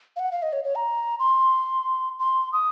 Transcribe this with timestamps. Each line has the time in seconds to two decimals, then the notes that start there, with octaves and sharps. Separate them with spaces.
0.16 F5
0.19 F#5
0.32 F5
0.43 D#5
0.53 C#5
0.64 C#5
0.75 A#5
1.19 C6
2.19 C6
2.53 D#6